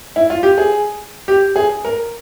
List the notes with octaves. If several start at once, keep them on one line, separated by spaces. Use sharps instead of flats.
E4
F4
G4
G#4
G4
G#4
A#4